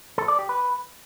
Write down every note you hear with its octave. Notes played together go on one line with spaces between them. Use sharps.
A4
D5
G4
B4